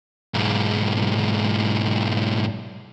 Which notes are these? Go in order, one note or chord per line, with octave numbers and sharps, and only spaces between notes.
B1 G#2